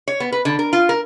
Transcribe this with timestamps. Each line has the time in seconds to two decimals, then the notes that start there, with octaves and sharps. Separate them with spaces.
0.08 C#5
0.20 B3
0.32 B4
0.45 D3
0.59 A#4
0.73 F4
0.89 A#4